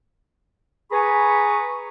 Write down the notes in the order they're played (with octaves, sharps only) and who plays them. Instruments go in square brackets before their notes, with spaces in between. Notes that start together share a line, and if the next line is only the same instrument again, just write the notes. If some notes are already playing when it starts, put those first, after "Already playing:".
[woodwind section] G#4 B4 G#5 A#5 B5 C#6